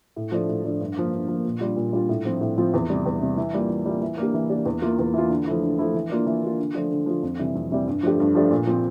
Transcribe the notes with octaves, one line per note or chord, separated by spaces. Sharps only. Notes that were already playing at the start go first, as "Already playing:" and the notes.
A2
F3 A3 D4
A2
F3 A3 D4
G2
F3 A#3
G2
F3
A#3
A#2
G3 D4 F4
A#2
G3 D4 F4
A2
F3 C4 F4
A2
F3 C4 F4
E2
C3 G3
E2
C3 G3
E3
G3 A#3 F4
E3
G3 A#3 F4
E3
A#3 D4 G4
E3
A#3 D4 G4
E2
E3 A#3 F4
E2
E3 A#3 F4
D3
F3 A3 E4
D3
F3 A3 E4
E3
A#3 D4 F4
E3
A#3 D4 F4
D3
F3 A3 D4 F4
D3
F3 A3 D4 F4
F2
C3 E3 G3
F2
C3 E3 G3
G2
F3 A3 D4 G4
G2
F3 A3 D4 G4
A#2
F3 C4